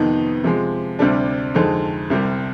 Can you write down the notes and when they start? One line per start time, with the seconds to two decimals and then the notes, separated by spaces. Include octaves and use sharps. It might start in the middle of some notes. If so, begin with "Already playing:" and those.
Already playing: F2 C3 D#3 B3 D#4
0.44 C3 F3 G#3
0.99 D2 C3 G3 D4
1.55 F2 D3 G#3 C4 D#4
2.10 C2 C3 G3